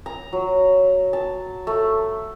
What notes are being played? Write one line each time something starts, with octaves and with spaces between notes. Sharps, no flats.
A#5
F#3
A5
A3